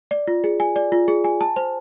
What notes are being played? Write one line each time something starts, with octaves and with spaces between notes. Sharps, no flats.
D5
F4
G#4
G#5
D5
F4
G#4
G#5
A5
C5